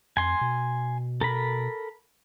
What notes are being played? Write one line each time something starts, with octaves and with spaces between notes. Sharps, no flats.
F2 G#5 C6
B2
A4 A#4 B5